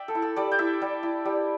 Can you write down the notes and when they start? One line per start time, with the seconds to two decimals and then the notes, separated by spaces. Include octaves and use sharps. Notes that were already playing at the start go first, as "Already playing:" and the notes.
Already playing: D5 E5 G5
0.08 A4
0.15 E4
0.22 A4
0.36 G3 D5
0.52 G5
0.59 E4 E5
0.82 G3
1.03 E4
1.25 G3